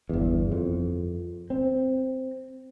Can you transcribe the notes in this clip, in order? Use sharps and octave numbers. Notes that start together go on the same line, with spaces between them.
G1 E2
F2
C4